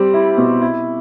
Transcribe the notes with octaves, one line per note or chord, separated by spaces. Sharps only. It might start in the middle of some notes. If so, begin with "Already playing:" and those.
Already playing: G3 C4
E4
B2
E4